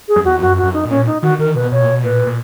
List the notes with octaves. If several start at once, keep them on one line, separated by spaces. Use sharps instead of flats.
G#4
F#2
E2 F#4
F#2 F#4
F#2 F#4
D#4
A#2
C#4
D#4
D#3 F#4
D#3 A#4
B2 B4
B2 C#5
A#2
B2
A#2 B4
A#2